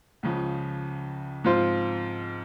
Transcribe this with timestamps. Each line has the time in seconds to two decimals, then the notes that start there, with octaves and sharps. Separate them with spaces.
0.23 C#2 C#3 F3
1.44 G#2 F3 C4 F4 C5